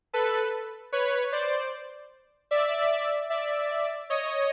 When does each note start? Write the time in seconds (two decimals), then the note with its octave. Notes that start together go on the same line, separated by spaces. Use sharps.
0.13 A4 B4
0.93 B4 C#5
1.32 C5 D5
2.51 D5 E5
3.30 D5 E5
4.10 C#5 D#5